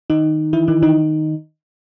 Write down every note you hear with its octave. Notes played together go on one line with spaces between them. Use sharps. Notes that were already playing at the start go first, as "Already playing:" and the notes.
D#3 D#4
E3 E4
D#3 D#4
D#3 D#4